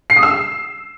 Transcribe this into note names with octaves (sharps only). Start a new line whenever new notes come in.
C7
D#6
E6